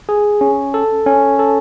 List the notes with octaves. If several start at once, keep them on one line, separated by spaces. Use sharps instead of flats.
G#4
C#4
A4
C#4
A4